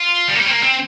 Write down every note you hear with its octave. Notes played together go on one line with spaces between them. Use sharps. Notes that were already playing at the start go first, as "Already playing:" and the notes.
Already playing: F4
G3
A#3
G3
C4
A#3
C4